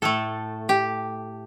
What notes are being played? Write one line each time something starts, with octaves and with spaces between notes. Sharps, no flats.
A2 A3 A4
G4